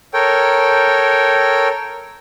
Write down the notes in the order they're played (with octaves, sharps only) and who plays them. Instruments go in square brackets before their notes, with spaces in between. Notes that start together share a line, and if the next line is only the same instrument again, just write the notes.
[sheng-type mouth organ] A4 A#4 C#5 G5